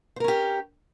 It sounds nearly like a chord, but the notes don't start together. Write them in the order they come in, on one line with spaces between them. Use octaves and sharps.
C5 A#4 C#4 G4